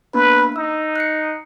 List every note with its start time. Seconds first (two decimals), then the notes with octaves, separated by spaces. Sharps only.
0.14 A#3 B3 D4 B4
0.56 D#4 E6
0.96 F#6 C7 C#7